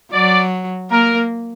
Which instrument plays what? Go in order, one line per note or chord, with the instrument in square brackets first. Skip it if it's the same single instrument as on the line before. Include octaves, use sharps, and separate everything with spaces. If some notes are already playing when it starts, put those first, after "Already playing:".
[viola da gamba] F#3 [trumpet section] D5
[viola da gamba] A#3 [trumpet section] A#4